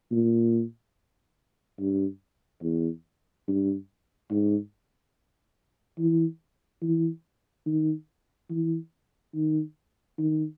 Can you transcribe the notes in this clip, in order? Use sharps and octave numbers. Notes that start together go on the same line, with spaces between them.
A#2
G2
E2
G2
G#2
E3
E3
D#3
E3
D#3
D#3